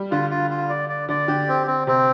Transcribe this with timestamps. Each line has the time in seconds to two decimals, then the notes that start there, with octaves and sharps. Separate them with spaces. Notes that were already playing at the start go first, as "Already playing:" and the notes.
Already playing: G3
0.11 D3 F4
0.30 F4
0.51 F4
0.70 D5
0.89 D5
1.09 D3 D5
1.28 D3 G4
1.48 C4
1.67 C4
1.87 C3 C4